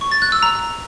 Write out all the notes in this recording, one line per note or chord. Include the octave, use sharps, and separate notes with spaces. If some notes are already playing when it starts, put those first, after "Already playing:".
C#6
A6
F#6
E6
A#5